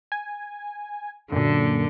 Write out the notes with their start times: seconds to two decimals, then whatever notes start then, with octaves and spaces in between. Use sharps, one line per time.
0.12 G#5
1.32 F#2 A#2 D3